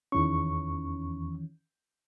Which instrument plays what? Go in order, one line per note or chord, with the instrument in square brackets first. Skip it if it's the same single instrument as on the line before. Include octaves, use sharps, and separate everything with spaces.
[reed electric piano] E2 C#6 [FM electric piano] D#3 E3 C#4